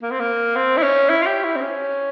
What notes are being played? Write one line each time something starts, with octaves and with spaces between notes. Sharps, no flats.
A#3
C4
A#3
C4
E4
C#4
E4
F4
G4
E4
C4
C#4